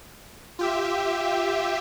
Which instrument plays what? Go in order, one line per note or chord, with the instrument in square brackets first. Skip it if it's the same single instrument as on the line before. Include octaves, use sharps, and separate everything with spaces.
[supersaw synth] F4 G4 E5